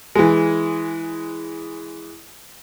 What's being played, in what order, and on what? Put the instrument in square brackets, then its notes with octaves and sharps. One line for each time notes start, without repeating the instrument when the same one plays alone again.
[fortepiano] E3 G#3